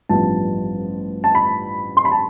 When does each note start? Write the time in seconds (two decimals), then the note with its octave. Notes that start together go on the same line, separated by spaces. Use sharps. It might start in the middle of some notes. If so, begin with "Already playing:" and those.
0.09 A1 G2 F3 B3 A5
1.24 A5
1.35 B5
1.97 C6
2.05 B5
2.12 A5